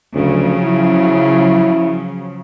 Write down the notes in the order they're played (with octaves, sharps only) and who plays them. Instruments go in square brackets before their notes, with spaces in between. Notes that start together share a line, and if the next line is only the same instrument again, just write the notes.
[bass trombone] D2 [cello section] C#3 F3 F#3
[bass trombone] E4